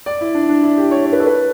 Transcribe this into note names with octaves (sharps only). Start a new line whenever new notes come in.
D5
E4
D4
D4
E4
G4
C#5
C#5
B4
A4
B4